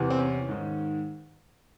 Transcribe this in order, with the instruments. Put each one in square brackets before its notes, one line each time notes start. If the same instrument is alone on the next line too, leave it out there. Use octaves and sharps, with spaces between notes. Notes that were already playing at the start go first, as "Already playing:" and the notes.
Already playing: [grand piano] E2 C3 E3
C4
C#4
G#2 D#3